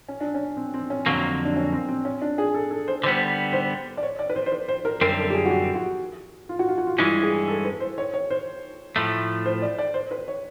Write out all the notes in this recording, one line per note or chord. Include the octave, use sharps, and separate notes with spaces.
C#4
D4
C#4
C4
C4
C#4
F2 D3 F#3 A#3 C4
D4
C#4
C4
C4
C#4
D4
G#4
A4
A4
C5
D3 G3 B3 C5
C5
D5
C#5
D5
B4
C5
C5
B4
C5
A#4
F#2 D3 G3 C4 A#4
A4
G4
G#4
F#4
G4
F#4
F4
F#4
F4
F#4
F4
G2 E3 G#3 C#4 E4
G#4
A4
B4
C5
C#5
C#5
C5
A2 F3 A3
C5
D5
D5
C5
B4
C#5